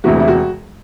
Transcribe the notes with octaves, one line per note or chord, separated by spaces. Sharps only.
E1 D2 C3 E3 F#4
E4
F#4